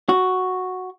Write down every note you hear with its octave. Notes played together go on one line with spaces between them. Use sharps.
F#4